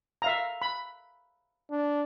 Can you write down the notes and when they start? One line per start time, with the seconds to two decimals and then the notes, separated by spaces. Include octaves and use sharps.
0.22 E5 F5 A#5
0.62 B5
1.71 D4